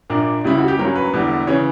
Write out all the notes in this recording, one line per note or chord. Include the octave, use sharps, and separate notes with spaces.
A#1 A#2 A#3 D4 A#4
C#2 C#3 G3 E4
F#4
G4
G2 F#3 A#3 C#4 A#4
B4
E1 E2 D3 G3
C#3 E3 C#5